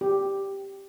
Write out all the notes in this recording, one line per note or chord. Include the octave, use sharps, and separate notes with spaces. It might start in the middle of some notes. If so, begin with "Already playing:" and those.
G4